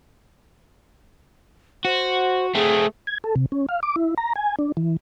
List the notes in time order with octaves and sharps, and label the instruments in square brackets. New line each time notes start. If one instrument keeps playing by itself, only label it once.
[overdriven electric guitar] F#4 [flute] C5
[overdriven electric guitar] A3 C4 [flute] G#4
[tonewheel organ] G#6
A4
C3
C#4
F5
D6
E4
A#5
G#5
D4
E3